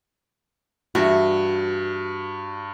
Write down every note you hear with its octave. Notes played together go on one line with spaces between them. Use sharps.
G2 E3 F#4 G#4 E5